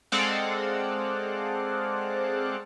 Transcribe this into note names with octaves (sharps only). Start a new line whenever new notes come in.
G#3 C4 A4 D5 F5 F#5